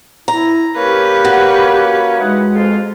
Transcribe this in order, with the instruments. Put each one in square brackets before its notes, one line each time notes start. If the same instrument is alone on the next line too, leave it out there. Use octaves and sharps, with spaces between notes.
[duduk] E4 [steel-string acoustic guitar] A#5
[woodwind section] A#3 C#4 [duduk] G4 [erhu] B4
[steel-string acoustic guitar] F#4
[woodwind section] E3 D#4 F#5 [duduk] G#3
[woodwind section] F2 G#2 F4